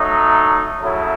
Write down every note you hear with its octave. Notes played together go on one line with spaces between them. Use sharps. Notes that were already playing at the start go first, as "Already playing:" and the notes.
Already playing: F#3 A3 D#4
C#3 F#3 A3 E4 A4